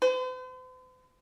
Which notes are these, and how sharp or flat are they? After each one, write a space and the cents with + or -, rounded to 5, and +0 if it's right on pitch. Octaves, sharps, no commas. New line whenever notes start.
C5 -45